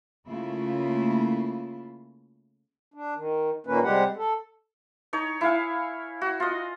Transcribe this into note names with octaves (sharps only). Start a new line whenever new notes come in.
C#3 A3 A#3 E4 F4
D4
D#3
A#2 D#3 A#3 C#4 B4
C3 G3 G#3 G4 F#5
A4
D#4 C#5
E4 F5 G#5
F#4
F4 D#5